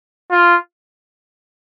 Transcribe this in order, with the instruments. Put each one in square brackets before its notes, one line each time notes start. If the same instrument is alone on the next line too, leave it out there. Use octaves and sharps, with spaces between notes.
[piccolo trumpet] F4